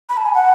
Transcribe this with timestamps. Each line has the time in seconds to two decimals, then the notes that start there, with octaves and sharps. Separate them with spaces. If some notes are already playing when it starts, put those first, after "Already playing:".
0.09 B5
0.17 A5
0.25 G#5
0.34 F#5